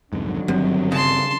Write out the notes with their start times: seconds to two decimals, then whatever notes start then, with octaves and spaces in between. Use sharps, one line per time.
0.13 C2 F2 G#2 D3 D#3 F#3
0.48 G1 F#2 G3 C4
0.92 C#3 A5 C6